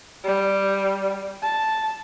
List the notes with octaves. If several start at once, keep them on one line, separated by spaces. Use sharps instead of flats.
G3
A5